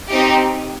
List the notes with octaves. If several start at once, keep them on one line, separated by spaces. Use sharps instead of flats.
C4 D#4 G4